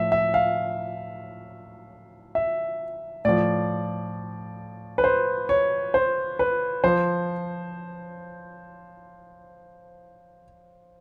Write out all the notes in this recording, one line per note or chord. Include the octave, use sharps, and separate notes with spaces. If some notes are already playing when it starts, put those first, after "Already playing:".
Already playing: A2 F3 E5
E5
F5
E5
A2 F3 D5
B4
C5
C#5
C5
B4
F3 C5